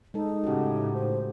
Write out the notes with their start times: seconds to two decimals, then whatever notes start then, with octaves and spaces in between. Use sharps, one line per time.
0.14 G#3 D#4 A4
0.44 A2 C#3 F#4 G4
0.94 C5